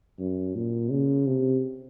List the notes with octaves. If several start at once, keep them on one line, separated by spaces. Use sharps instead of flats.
F#2
A#2
C#3
C3